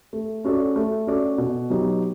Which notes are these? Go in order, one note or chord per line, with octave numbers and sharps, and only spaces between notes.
A3
C#4 F#4 A4 D5
A3
C#4 F#4 A4 D5
B2
F#3 B3 D#4 G4